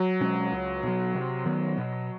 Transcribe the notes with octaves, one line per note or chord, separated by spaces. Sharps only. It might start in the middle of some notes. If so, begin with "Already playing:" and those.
Already playing: F#3
B2 G#3 C#4
C#2
B2 F#3
C3
D#3 F#3 B3
B2